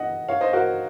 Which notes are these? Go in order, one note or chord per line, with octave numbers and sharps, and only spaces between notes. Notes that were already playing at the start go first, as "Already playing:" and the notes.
Already playing: D#5 F#5
C#5 F5
C5 D#5
F#4 A#4